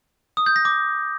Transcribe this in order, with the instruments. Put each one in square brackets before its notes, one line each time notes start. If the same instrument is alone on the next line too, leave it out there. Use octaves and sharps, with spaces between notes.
[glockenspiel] D#6
G6
A#6
D6